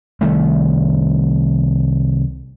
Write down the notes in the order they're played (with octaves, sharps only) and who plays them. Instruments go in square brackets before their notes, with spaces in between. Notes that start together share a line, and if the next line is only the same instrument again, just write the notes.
[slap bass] C2 D#3 A3